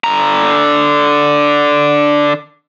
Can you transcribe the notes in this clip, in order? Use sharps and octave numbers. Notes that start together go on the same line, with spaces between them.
D3 A#5